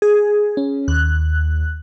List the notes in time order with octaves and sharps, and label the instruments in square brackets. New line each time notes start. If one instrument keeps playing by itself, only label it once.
[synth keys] G#4
[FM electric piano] C#4
[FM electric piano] D#2 [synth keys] F#6